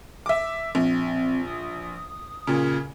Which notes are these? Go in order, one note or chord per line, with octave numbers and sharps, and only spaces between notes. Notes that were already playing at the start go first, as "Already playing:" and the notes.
E5 D6
A#1 C4
D#6
A#2 C#3